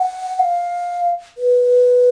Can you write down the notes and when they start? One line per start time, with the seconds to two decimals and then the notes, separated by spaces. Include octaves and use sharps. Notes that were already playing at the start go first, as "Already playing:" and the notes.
Already playing: F#5
0.39 F5
1.38 B4